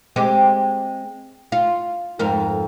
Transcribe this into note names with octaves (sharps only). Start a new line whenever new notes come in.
G#3 C4 G4
F4
F2 G#2 A#4